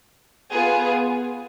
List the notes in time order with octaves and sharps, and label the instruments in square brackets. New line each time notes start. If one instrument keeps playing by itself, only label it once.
[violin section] B3 F4 G#4